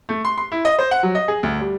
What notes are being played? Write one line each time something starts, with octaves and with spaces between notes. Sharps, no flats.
A3
C6
C6
E4
D#5
C5
F#5
F#3
D#5
G#4
D2
G3